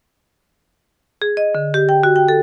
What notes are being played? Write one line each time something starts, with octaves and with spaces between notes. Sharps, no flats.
G#4
D#5
D3
G4
G5
F#4
G5
A4